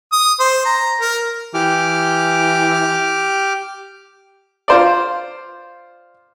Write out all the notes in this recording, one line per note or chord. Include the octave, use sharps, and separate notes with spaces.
D#6
C5
A#5
A#4
E3 G4 D6 F6
F4 C5 D5